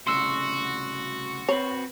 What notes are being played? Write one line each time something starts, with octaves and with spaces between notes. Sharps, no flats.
C2 A2 C#3 F#4 C6 E6
C4 B4 C#5